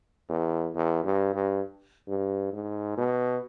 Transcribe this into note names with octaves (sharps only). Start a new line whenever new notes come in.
E2
E2
G2
G2
G2
G#2
B2